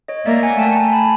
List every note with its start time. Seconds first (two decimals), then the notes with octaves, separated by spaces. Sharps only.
0.08 C#5 D#5
0.26 A#3 D5 E5
0.43 F#5 G#5
0.59 A3 G5 A5
0.76 G#5 A#5
0.92 A5 B5